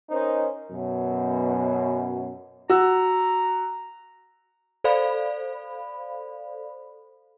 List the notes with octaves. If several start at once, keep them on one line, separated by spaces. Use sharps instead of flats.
C#4 D#4 A#4 C5 D#5
F#2 B2
F#4 A#5 E6
A4 C5 D5 F5 B5